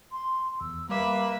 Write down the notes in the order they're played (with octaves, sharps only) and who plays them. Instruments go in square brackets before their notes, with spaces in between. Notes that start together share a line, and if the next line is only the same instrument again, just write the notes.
[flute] C6
[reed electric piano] E2 [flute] E6
[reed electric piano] G3 D6 [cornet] A#3 [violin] B4 E5 [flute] F5